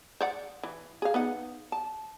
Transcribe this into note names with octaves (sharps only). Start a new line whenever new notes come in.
C5 D5 F#5
E3
G#4 F5
B3 D#4 F#5
A5